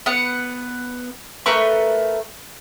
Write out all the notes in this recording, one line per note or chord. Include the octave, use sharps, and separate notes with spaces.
B3 B4 F#5
A3 A#4 B4 C#6